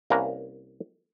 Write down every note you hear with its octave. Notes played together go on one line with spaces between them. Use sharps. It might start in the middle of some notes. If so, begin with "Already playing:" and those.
C2 A#3 C#4 B4 A#5